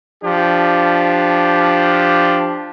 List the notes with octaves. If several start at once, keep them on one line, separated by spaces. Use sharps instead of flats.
F3 D4 G4